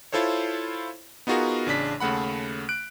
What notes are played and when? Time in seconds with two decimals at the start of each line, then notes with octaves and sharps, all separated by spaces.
0.12 E4 F4 A4 C5 C#5
1.27 B3 D#4 F4 F#4 G#4 A#4
1.66 A1 C#3 D4 B6
2.00 D#2 C#3 A3 F#5 B5
2.69 F#6 D7